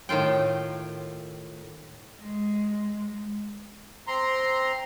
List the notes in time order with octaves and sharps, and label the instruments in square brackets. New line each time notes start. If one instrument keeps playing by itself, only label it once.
[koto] A2 D#3 F4 G5
[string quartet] G#3
[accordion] C4 A#5 C6